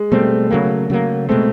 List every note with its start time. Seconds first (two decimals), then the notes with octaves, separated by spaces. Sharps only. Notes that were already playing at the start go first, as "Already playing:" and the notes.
Already playing: G#3
0.12 B2 G3 A3 C4
0.51 C#3 F#3 A#3
0.90 C#3 F#3 A#3
1.29 B2 G#3 A3 C4